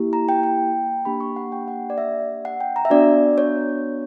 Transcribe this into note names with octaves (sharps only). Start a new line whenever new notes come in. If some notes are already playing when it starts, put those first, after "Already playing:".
Already playing: A#3 E4 G4
A#5
G5
G5
A#3 D4 G4 B5
C#6
F#5
G5
F#5
D5
E5
F#5
G5
A#5
E5
B3 D4 F#4 D5
C#5